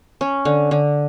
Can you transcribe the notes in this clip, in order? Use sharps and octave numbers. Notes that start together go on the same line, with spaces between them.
C#4
D3
D3